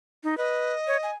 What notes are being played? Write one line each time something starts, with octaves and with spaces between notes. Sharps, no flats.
D#4
B4 D#5
C#5
G#5